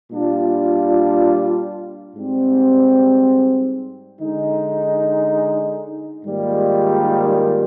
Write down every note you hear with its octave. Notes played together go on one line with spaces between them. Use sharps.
A#2 G3 D4 F4
G#2 G3 C4
D3 G#3 D#4
G#2 D#3 G3 A#3 F4